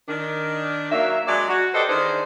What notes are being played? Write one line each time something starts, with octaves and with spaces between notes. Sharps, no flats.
D#3 D4
F#3 A#3 E5
F#3 G#3 D4 D5
F#4
G4 A4 B4 C5 D5 D#5
D#3 E3 D4 G#4 C5